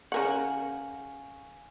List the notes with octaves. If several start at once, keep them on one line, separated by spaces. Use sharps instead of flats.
C#3 A#4 F5 F#5 G#5 C#6